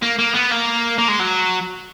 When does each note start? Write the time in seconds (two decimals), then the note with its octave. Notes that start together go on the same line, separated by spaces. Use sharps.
0.02 A#3
0.18 A#3
0.34 B3
0.50 A#3
0.98 A#3
1.09 G#3
1.20 F#3